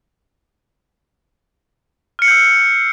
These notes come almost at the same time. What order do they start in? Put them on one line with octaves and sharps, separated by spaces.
F6 C#7 C7 G6 E6